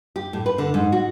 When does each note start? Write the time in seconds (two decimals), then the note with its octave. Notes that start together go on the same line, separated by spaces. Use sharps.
0.16 G4
0.33 A2
0.46 B4
0.58 D3
0.74 G#2
0.92 F#4